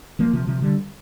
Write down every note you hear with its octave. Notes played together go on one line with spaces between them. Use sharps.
F3 A#3
C3 F3
C3 F3
D3 G3